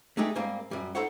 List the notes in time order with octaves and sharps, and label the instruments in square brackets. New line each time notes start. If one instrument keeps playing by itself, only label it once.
[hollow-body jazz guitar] A3 D4 D#4 G4 G#4
G#2 G3 A#3 C4
F#2 G3
D#4 A4 C5 C#5 F#5